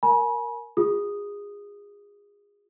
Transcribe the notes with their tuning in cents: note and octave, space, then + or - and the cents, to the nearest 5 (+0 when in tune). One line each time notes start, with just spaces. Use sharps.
A#4 +0 G#5 +30 B5 -40
F4 +35 G#4 -25 D#6 -10